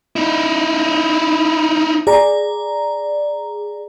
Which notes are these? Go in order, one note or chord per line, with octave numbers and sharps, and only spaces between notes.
D#4 E4
G#4 D5 A#5